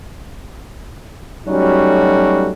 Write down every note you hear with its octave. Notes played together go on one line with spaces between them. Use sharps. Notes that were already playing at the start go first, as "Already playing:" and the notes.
F#3 G3 A3 C#4 D#4 F#4